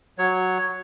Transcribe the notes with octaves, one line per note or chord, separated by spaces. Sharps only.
F#3 C#5